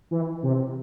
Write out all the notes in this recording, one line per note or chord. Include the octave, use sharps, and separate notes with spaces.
E3
C3